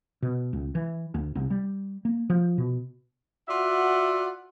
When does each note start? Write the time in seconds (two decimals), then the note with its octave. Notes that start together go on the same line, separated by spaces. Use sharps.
0.22 B2
0.53 C#2
0.75 E3
1.14 D2
1.35 C2
1.50 G3
2.05 A#3
2.30 F3
2.58 B2
3.49 F4 F#4 D5 E5 F#5